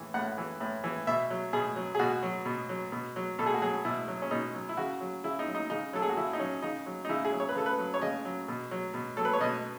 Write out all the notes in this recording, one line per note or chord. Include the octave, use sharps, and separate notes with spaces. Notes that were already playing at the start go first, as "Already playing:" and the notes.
Already playing: A2 E3
A2 F#5
E3
A2
E3
B2 E5
F#3
B2 G#4
F#3
G#4
B2 F#4
F#3
B2
F#3
B2
F#3
B2 A4
G#4
F#4
F#3 G#4
B2 E4
F#3
C#4
B2 D#4
F#3
E4
C#3 F#4
F#3
C#3 E4
D#4
F#3
D#4
C#3 D#4
F#3 A4
G#4
F#4
C#3 E4
D#4
F#3 C#4
C#3 D#4
F#3
D#4
C#3 E4
G#4
F#3
C#5
B4
C#3 A4
B4
F#3
C#5
C#3 D#5
F#3
B2
F#3
B2
F#3 A4
B4
C#5
B2 D#5